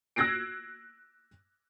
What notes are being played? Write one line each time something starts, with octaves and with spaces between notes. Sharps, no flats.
E6 F#6 G#6 A#6 C7 D7